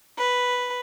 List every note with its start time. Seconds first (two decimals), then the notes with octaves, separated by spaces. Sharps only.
0.17 B4